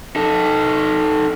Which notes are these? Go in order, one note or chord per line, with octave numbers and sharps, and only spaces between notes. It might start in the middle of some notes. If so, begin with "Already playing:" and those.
D#4 A4